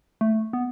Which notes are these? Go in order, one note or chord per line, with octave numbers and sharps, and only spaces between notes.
A3
B3